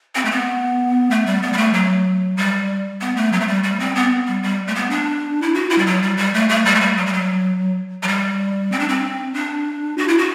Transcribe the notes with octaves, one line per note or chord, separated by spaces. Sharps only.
C4
A3
B3
A3
G3
B3
G3
A3
F#3
G3
B3
A3
F#3
A3
G3
G3
C4
B3
G3
G3
A3
B3
D4
E4
F#4
E4
G3
F#3
G3
G3
A3
A3
G3
A3
G3
F#3
G3
F#3
F#3
G3
C4
D4
C4
D4
F#4
E4
F#4